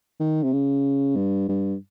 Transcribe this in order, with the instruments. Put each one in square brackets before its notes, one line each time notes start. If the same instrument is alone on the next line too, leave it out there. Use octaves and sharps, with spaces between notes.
[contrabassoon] D#3
C3
C#3
G2
G2